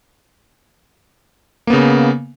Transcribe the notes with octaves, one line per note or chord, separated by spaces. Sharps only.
C#3 A#3 B3